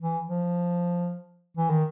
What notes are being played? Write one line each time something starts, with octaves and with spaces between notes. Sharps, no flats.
E3
F3
E3
D#3